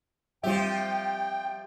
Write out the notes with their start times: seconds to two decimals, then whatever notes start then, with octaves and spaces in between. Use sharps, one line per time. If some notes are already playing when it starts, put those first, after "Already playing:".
0.43 F3 G3 C4 F4 G4 E5 G5